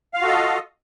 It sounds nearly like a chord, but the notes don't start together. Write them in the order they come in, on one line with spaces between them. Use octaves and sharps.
F5 F4 F#4 A4 D#5